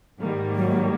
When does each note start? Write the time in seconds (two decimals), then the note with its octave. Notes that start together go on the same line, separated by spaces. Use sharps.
0.19 G#2 D#3 G3 A#3
0.55 F#3